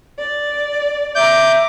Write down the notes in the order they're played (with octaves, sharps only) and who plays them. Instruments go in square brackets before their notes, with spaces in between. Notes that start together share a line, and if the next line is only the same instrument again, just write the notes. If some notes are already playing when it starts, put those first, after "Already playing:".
[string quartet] D5
[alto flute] E5 [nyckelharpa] A#5 D6 [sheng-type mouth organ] G6